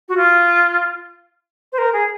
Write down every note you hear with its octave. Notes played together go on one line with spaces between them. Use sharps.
F#4
F4
C5
A#4
G#4